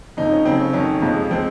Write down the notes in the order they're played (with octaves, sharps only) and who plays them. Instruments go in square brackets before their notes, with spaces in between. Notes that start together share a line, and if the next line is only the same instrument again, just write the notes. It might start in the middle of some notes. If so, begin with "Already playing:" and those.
[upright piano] F2 C3 F3 D#4
C#4
F2 C#3 F#3 C4
C#4
F2 D#3 F#3 C#4
F2 C3 F3 G#3
F3 G#3 C4